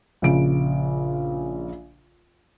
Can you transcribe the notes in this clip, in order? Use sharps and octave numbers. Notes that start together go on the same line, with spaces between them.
A#1 C#3 D7